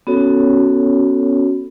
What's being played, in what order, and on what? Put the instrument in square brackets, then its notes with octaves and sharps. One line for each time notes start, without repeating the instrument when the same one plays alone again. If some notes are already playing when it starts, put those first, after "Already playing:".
[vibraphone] B3 C#4 F#4 A4 C#5